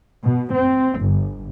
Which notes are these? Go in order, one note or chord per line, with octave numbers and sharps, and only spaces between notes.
B2
C4
G1